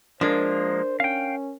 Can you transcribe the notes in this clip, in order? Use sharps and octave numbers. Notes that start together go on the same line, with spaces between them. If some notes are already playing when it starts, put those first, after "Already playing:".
F3 G#3 A#3 D4 A#4 C5
C#4 F5 G5